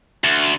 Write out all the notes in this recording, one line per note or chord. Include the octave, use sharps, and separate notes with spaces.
D2